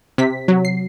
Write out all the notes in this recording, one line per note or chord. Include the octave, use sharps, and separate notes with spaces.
C3 B6
F#3
C7